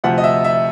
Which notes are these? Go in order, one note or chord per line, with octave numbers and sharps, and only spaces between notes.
D2 C3 F3 F#5
D#5
E5
E5